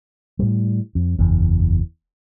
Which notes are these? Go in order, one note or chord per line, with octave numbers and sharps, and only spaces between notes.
A2 G3
F2
F#1 E2